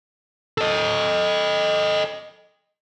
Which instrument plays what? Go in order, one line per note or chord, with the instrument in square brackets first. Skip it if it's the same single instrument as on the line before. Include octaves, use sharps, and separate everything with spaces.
[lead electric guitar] A4 D#5